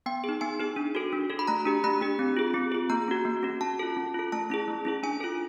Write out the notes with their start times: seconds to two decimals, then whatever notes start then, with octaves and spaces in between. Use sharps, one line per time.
0.06 B3 G5
0.24 D#4 G#4
0.41 B3 G#5
0.59 D#4 G#4
0.76 D4
0.95 F#4 A4
1.13 D4
1.30 F#4 A4
1.39 B5
1.47 A3 A#5
1.65 D4 G4
1.84 A3 B5
2.01 D4 G4
2.19 C4
2.37 F4 G#4
2.54 C4
2.72 F4 G#4
2.90 A#3 A#5
3.08 C#4 F#4
3.25 A#3
3.43 C#4 F#4
3.61 C#4 A5
3.79 F4 A4
3.97 C#4
4.14 F4 A4
4.32 A3 A5
4.50 C#4 E4 G#4
4.68 A3
4.85 C#4 E4 G#4
5.03 D4 G#5
5.21 F4 A4